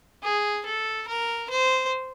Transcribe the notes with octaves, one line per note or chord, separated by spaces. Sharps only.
G#4
A4
A#4
C5